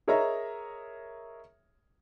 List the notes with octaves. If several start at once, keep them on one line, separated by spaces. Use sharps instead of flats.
G#4 A#4 C#5 D#5 E5 A#5